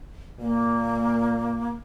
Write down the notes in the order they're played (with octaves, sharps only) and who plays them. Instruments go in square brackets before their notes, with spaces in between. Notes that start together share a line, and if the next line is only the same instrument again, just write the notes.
[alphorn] A#2 [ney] A#3